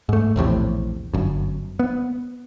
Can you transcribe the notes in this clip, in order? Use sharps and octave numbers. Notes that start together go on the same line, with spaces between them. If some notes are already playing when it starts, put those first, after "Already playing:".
G#2 A3
A#1 E2 A2 C3
G1 F#2
B3